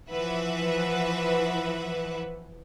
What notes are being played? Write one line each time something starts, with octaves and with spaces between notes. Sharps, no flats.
E3 F3 B4 E5 F#5